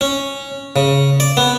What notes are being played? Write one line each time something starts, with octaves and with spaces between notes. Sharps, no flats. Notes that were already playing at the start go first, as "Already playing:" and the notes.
C#4
C#3
D5
B3